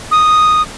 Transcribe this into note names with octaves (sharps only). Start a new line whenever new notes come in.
D#6